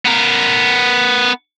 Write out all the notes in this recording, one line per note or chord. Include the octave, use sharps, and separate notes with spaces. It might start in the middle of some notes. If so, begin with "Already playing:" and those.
B3 A#4